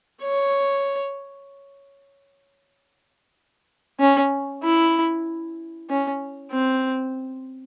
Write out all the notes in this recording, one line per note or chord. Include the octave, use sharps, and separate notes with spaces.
C#5
C#4
E4
C#4
C4